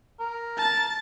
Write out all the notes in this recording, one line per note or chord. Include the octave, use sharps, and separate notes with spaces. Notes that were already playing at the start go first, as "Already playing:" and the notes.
A#4
A5 A6